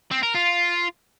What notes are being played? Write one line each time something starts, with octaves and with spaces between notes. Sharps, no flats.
C4
A#4
F4